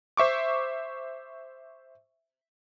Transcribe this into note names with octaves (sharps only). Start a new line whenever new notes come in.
C5 E5 C#6 D6